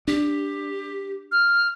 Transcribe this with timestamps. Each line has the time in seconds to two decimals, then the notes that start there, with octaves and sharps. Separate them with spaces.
0.08 D4 G4
1.31 F6